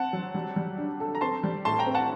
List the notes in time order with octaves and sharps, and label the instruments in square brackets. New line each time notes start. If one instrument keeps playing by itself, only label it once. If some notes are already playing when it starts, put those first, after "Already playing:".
Already playing: [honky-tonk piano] C4 [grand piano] F#5 A5
[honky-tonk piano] F#3
G3
G3
D4
A4
[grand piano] A#5
[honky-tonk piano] C4 [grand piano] A5 C6
[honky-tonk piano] G3
[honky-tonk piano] A2 [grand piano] A5 C6
[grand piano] G5 A#5
[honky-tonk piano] C4
[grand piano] F#5 A5